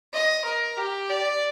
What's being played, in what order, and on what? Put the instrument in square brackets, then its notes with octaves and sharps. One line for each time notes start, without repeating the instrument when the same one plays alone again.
[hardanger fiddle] D#5
A#4
G4
D5